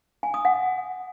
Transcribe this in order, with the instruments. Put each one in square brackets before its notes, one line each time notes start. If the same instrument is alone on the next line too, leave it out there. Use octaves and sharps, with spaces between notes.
[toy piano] G#5
D#6
F#5